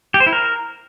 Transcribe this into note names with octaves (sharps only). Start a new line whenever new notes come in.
G4
C5
E4
A#4